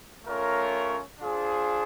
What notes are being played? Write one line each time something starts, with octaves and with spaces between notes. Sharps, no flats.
A3 C#4 F4 A#4 C#5
D4 F4 G#4 C5